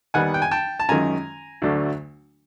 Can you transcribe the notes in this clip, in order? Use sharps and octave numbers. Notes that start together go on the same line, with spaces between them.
D#2 D#3 G3 B3 F#5 G#5
G5
G#5
G5 A5
A5
F#2 D#3 G#3 C#4 F4 G#5 A#5
D2 D3 F#3 A3 D4